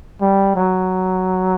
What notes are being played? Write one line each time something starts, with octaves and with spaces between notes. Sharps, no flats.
G3
F#3